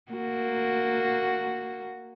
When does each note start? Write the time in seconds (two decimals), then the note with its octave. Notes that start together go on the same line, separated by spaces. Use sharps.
0.12 A#3 F#4